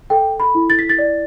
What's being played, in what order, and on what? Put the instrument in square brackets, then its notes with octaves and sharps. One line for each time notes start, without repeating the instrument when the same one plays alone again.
[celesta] A4 G5
B5
E4
A6
B6
A6
D5